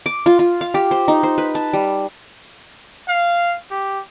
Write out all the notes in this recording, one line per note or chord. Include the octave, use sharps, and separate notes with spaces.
D6
F4
F4
F5
G4
C5
D#4
C5
B4
A5
G3
F5
G4